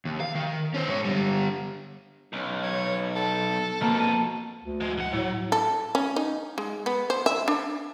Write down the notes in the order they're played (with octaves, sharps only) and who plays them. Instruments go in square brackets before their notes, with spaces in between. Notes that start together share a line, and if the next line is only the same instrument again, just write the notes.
[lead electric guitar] D#2
F5
D#3
C#4 C5
G#2 C#5
D3 G3
[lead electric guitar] B1 [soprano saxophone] C#4
[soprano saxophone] C#5
A4
[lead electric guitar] F2 B2 [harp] A#3 A5
[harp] D#7
[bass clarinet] D2
[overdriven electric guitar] F3 G#3
C#2 F#5
[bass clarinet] A2 [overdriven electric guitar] F#3
[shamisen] A4
C#4
D#4
G#3
B3
C5
E5
D4